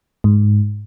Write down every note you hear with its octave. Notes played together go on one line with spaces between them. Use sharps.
G#2